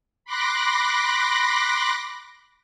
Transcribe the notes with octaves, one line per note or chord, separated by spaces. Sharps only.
B5 C6 D6 F#6 A#6